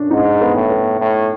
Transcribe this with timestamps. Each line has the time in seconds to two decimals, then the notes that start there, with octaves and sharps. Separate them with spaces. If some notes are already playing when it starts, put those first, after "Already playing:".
Already playing: C#4 D4
0.11 G#2 D#4
0.41 B3
0.55 A2
0.70 B3
0.99 A2